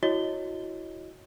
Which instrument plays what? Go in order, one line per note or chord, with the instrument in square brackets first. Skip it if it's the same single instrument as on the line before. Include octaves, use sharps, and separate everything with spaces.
[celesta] E4 F#4 C#5 D#5 G7